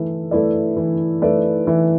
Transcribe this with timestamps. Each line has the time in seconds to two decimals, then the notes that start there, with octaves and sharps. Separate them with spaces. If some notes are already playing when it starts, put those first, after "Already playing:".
Already playing: E3 A3 E4 B4
0.31 A3 E4 B4 D5
0.77 E3
1.22 A3 E4 B4 D5
1.67 E3